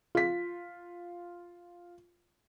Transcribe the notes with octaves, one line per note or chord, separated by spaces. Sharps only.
F4 B6